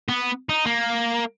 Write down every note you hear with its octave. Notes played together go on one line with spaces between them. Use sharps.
B3
D#4
A#3